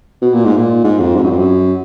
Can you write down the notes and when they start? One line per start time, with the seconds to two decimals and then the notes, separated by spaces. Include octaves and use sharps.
0.22 B2
0.34 A#2
0.45 G#2
0.57 A#2
0.84 G#2
1.00 F2
1.16 G#2
1.23 F#2
1.31 F2
1.39 F#2